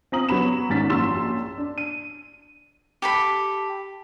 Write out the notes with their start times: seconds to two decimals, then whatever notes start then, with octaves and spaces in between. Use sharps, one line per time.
0.12 C4 F4 A#5 D#6 F#7
0.29 F#3 B3 B5 E7
0.69 G#1 G#2 C#4 A6 B6
0.90 A#1 F#2 C6 E6 A6 E7
1.58 D4
1.78 D#7
3.02 G4 A4 B5